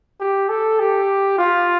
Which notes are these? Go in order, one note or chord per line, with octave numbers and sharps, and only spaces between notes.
G4
A4
G4
F4